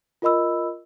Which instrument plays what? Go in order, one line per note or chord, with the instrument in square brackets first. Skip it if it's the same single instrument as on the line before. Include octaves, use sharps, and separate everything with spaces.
[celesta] F4 A#4 D#5 B5 E6